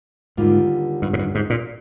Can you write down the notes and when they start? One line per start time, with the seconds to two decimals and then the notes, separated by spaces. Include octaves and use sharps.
0.37 D#2 G#2 D3 G3 A#3 F4
1.02 G2
1.13 G#2
1.19 G2
1.35 G#2
1.50 A#2